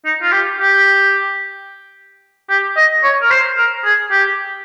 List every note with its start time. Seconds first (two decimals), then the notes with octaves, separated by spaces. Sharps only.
0.05 D#4
0.22 F4
0.32 G4
0.60 G4
2.50 G4
2.77 D#5
3.03 C#5
3.22 A#4
3.30 C5
3.58 A#4
3.84 G#4
4.12 G4